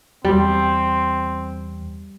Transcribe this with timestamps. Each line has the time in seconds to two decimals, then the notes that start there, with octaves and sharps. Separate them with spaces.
0.25 E2 G3 C4